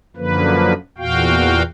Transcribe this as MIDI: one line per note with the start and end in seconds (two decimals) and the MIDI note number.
0.17 0.73 42
0.17 0.73 50
0.17 0.73 53
0.17 0.73 58
0.17 0.73 71
0.98 1.63 40
0.98 1.63 46
0.98 1.63 66
0.98 1.63 77
0.98 1.63 79